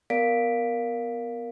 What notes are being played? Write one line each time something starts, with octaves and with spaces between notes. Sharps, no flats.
B3 A#4 D5 F5 B6 D7